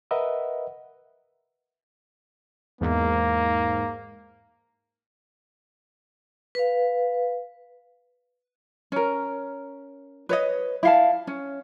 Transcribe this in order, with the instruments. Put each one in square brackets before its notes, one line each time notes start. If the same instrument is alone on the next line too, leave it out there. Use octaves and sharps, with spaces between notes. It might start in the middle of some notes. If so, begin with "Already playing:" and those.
[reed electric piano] A#4 B4 D#5 E5 F#5
[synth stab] E2 [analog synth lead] G#2 [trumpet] A#3
[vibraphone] B4 F5
[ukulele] C#4 A#4
B4 C#5 D#5
E4 F5 A5
C#4